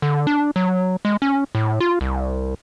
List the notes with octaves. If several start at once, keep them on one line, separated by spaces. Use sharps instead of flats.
D3
D4
F#3
G#3
C#4
A2
F4
C2